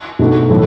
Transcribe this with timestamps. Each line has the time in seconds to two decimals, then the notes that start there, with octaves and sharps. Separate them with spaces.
0.19 B2 A3 D#4 F#4
0.50 A2 E3 A3